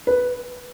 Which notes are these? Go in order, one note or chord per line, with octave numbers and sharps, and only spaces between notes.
B4